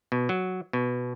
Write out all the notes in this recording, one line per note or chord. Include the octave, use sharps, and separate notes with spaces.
B2
F#3
B2